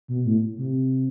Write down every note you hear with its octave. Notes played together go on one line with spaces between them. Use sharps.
B2
A2
C3